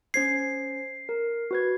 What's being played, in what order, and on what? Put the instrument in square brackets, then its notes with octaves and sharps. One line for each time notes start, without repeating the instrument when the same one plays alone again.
[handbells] C#4 C5 G#6 [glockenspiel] C7
[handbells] A#4
F#4 B4 G#6